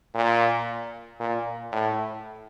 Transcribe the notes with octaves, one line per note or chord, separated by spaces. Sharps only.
A#2
A#2
A2